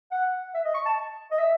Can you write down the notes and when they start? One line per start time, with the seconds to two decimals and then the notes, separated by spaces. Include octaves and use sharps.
0.11 F#5
0.54 E5
0.65 D#5
0.75 C#6
0.86 A5
1.31 D#5
1.38 E5